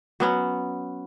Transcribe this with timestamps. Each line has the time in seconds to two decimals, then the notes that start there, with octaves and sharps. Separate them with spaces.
0.20 F#3 B3 C#4